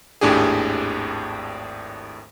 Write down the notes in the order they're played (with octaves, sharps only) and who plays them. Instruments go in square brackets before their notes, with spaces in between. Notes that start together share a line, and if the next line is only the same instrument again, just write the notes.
[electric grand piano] G#1 D#2 A2 D4 G4 G#4